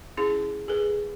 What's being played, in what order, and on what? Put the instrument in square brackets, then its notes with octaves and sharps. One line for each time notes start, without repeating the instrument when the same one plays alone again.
[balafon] C#4 E4 G#4
[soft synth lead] G#4 [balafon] A4 B4